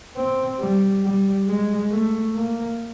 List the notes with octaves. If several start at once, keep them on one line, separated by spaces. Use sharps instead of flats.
C4
G3
G3
G#3
A3
A#3